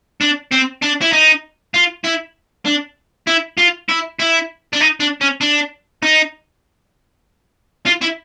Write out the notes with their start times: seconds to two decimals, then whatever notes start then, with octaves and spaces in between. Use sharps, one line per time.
0.21 D4
0.51 C4
0.82 D4
1.01 E4
1.12 D#4
1.74 F4
2.04 E4
2.65 D4
3.27 E4
3.58 F4
3.89 E4
4.19 E4
4.73 D4
4.81 D#4
5.00 D4
5.21 C#4
5.41 D4
6.03 D#4
7.86 F4
8.02 E4